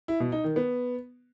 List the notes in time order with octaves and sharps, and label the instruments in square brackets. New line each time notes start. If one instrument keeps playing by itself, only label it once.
[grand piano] E4
B2
D#4
D#3
B3